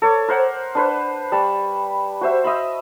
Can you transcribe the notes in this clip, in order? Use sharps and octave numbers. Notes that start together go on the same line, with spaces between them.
A4 C#5 D6
A#4 C5 F#5
D4 B4 C5
G3 A5 B5 C#6
F#4 C5 E5
D#5 E5 B5